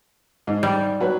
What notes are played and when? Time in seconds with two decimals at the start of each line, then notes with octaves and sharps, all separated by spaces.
0.47 G#2
0.63 G3
1.00 F#3 B4